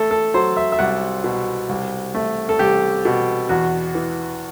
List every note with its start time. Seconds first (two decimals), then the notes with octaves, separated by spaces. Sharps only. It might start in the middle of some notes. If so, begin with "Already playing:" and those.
Already playing: A3 A4
0.11 A4
0.34 F#3 C5
0.57 E5
0.72 E5
0.79 C2 F#5
1.24 B2
1.69 C2
2.14 A3
2.49 A4
2.59 C2 G4
3.05 B2
3.49 E2 F#4
3.95 E3